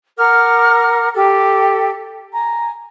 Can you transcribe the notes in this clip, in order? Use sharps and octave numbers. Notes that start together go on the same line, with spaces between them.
A#4 F#5 D6 F6
G4 A4
G#5 A#5